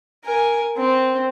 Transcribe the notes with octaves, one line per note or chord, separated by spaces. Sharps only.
A#4 G#5
C4